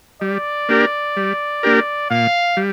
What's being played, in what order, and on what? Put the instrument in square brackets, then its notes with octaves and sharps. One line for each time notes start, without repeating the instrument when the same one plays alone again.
[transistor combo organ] G3 [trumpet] D5
[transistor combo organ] A#3 D4 G4 A#4
G3
A#3 D4 G4 A#4
[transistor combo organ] A#2 [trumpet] F5
[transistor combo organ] G3